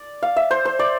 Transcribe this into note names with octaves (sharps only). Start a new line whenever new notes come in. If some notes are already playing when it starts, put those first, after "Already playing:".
Already playing: D5
F5
E5
C5
C5
D5